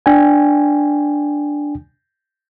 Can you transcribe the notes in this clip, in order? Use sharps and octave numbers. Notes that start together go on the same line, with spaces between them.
D4 G5 G#5